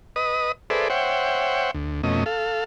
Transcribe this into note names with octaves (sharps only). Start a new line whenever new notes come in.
B4 D#5 D#6
G#4 A4 B4 C5 D5 E5
C5 C#5 E5 F#5 G5
D2
F2 B2 A3 C#4 D#5
A4 F5